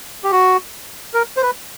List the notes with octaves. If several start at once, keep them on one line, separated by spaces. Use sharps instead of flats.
G4
F#4
A#4
C5
B4